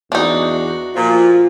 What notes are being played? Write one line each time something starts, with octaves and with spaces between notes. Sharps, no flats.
E2 D4 D#4 F#4
A#2 F3 F4